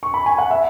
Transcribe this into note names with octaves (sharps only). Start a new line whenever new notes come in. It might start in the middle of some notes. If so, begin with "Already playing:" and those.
C#6
B5
G#5
F#5
E5